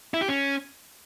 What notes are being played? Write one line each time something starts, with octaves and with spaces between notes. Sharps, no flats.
E4
G4
C#4